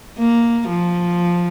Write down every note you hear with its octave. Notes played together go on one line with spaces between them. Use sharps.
A#3
F3